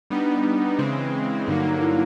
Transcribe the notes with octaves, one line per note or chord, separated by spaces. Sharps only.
G3 B3 D4 D#4
C#3 E3 G#3 C4
G2 D3 F#3 A#3 D#4
E4